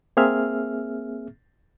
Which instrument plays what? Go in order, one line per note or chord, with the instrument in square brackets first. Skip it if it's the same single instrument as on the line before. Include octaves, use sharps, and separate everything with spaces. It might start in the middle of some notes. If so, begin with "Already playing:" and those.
[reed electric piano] A#3 C4 G#4 E5 F6